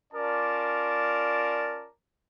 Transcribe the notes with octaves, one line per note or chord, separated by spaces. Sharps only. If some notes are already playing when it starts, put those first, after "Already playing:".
C#4 F4 A#4 D5 A5 D6